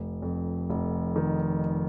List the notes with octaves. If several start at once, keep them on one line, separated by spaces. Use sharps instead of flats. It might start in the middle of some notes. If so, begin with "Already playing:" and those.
Already playing: F1
F2
F1
D#3